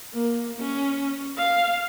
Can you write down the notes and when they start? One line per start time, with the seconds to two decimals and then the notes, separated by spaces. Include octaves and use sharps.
0.14 A#3
0.60 C#4
1.37 F5